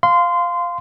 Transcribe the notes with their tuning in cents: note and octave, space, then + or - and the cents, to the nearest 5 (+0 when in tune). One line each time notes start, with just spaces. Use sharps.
F5 +0 C6 -20